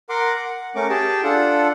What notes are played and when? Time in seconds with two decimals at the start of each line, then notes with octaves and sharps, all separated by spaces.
0.09 A#4 F#5 C6 D6
0.34 F#5
0.75 A3 C#4 A#4 C#6 D6
0.90 G4 G#4 G5 A5
1.23 D4 F4 A4 F#5